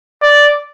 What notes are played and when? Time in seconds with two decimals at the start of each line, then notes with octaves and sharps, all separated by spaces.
0.22 D5